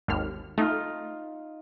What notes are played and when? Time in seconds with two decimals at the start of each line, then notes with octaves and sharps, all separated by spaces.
0.08 G#1 D#2 F6
0.58 A3 D#4 F4